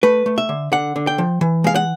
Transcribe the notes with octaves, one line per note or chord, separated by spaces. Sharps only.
A3 B4
A3
E5
D3
D3 F#5
D3
G5
F3
E3
G#3 F5
F#5